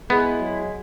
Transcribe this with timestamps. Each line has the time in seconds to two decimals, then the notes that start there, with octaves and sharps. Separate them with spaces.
0.10 G#3 B3 E4 G#4
0.40 F#3